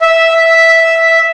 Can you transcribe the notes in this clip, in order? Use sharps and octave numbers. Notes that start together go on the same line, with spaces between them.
E5